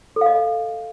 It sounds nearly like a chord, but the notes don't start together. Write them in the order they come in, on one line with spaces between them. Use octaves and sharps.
A4 F5 D#5